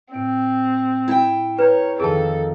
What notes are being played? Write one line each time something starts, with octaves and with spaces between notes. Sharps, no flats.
A2 C4 D7
E4 G5
B4 C#5 A#5 F6 G6
F2 D#3 G#4 A4 A5